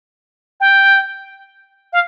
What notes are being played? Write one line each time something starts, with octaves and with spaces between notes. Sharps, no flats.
G5
F5